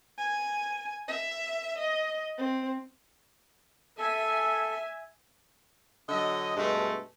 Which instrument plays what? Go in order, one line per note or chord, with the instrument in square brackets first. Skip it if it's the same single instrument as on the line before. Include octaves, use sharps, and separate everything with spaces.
[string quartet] G#5
E5
D#5
C4
[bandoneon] A4 [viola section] E5 G#5
[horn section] D3 F#3 D#5
G2 B2 G#3 A3